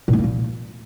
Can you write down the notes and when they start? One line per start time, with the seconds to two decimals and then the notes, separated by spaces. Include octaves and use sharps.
0.08 A#2
0.13 A3
0.18 A#3
0.24 A#2